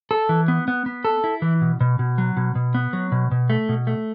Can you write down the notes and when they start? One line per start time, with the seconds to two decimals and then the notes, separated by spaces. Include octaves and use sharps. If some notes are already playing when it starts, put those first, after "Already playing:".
0.11 A4
0.29 E3
0.48 B3
0.68 B3
0.86 B3
1.05 A4
1.24 E4
1.42 E3
1.61 B2
1.80 B2
1.99 B2
2.18 F#3
2.37 B2
2.55 B2
2.75 B3
2.93 F#3
3.12 B2
3.31 B2
3.50 A3
3.69 B2
3.87 A3